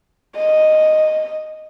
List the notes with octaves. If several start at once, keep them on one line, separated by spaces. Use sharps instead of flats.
D#5